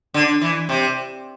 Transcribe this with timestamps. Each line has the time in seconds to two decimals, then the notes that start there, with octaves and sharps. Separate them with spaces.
0.14 D3
0.41 E3
0.69 C3